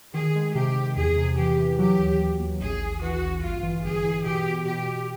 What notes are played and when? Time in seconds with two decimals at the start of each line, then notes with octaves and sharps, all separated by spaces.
0.14 D#3 G#4
0.35 G#3
0.55 C3 G4
0.76 C3
0.96 E2 G#4
1.16 C3
1.37 E3 G4
1.58 E3
1.78 F#3 G4
1.98 D#2
2.19 D#2
2.39 D#2
2.60 A1 G#4
2.81 A1
3.01 E3 F#4
3.22 A1
3.42 G1 F4
3.63 E3
3.83 G1 G#4
4.04 E3
4.24 B2 G4
4.45 B2
4.65 B2 G4
4.86 B2